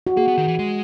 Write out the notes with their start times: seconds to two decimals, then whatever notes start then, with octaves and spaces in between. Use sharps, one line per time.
0.07 F#4
0.17 A#3 G#4
0.28 B3
0.38 D#3
0.48 E3
0.59 G#3